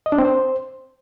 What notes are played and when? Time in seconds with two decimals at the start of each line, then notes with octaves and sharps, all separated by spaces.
0.06 D#5
0.12 D4
0.18 C4
0.25 C5